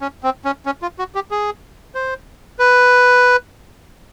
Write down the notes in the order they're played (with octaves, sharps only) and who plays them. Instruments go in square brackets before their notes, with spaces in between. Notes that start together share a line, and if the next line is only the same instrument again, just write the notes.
[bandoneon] C#4
C4
C#4
C#4
F4
F#4
G4
G#4
C5
B4